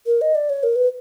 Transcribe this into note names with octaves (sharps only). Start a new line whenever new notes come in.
A#4
D#5
D5
C#5
A#4
B4